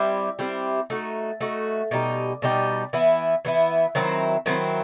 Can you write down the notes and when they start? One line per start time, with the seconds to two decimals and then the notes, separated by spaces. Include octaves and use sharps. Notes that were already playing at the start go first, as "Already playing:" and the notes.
Already playing: G3 C4 E4 G4
0.39 G3 C4 E4 G4
0.90 A3 D#4 F#4
1.41 A3 D#4 F#4
1.91 B2 G3 D#4 G4
2.42 B2 G3 D#4 G4
2.93 E3 B3 E4
3.45 E3 B3 E4
3.95 D#3 F#3 C4 E4
4.46 D#3 F#3 C4 E4